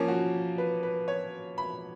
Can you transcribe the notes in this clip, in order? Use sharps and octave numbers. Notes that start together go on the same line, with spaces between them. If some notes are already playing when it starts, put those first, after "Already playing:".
Already playing: F3 A#3 C#4
F#4
B4
B4
C#5
B5